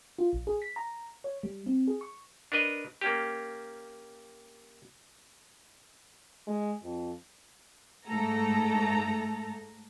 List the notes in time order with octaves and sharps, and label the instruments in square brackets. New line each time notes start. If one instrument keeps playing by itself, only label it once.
[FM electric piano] F4
A#1
G#4
B6
A#5
C#5
G3
C4
G#4
C#6
[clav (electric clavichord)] D4 A#4 B4 D#5
A#3 C#4 G4
[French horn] G#3
F2
[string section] G#2 A3 A4 A#5